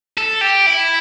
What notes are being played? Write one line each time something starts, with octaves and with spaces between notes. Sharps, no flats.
A4
G4
E4